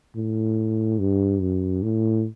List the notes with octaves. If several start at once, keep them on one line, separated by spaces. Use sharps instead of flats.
A2
G2
F#2
A2